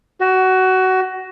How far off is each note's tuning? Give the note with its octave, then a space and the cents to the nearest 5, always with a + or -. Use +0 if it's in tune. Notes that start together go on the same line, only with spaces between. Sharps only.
F#4 +20